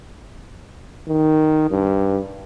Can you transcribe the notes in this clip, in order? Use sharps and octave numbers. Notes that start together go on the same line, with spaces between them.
D#3
G2